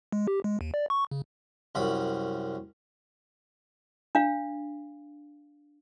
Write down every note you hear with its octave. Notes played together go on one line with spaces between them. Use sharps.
G#3
G4
G#3
D#2
D5
C#6
C#3
C2 F#2 B5
D4 F5